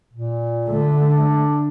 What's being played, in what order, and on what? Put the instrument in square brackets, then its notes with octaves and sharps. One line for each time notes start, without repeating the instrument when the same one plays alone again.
[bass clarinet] A#2
[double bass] D3 A3
[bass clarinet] D4